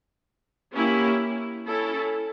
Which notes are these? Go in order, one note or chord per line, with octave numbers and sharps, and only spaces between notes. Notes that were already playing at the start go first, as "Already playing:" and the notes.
A#3 C#4 E4 G4
C#4 E4 A4